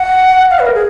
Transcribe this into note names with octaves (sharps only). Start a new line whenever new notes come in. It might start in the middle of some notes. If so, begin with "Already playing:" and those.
Already playing: F#5
F5
B4
A#4
G#4